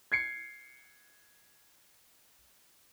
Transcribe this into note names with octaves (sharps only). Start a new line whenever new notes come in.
G#6 C7 C#7